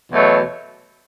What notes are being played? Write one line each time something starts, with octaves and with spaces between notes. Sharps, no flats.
E2 B2 F#3 A3